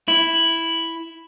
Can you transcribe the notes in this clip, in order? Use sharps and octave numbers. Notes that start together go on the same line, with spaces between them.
E4